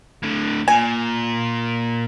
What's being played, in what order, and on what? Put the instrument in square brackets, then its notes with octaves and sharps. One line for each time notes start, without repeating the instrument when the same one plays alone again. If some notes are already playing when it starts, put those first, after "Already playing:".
[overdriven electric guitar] A2 D3
[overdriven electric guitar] A#2 [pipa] G#5